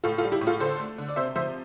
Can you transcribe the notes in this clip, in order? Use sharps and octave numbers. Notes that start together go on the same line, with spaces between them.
A2 F4 A4
F4 A4
G3
E4 G4
A2
F4 A4
D3 A4 C5
A3
D3
D5
C3 C5 E5
F3 C5 E5